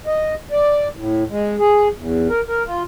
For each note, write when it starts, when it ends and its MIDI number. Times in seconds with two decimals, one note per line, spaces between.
0.07 0.34 75
0.51 0.88 74
0.97 1.24 45
1.30 1.56 56
1.59 1.88 68
1.97 2.28 40
2.29 2.41 70
2.48 2.63 70
2.66 2.83 65